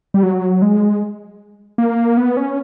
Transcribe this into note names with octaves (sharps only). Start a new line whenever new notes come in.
G3
F#3
G#3
A#3
B3
C#4